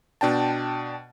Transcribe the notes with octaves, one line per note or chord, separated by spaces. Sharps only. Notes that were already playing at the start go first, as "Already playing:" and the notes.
B2 D4 G5 A5